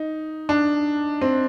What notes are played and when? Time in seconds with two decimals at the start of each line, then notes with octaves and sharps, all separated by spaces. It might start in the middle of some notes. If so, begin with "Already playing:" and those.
Already playing: D#4
0.49 D4
1.21 C4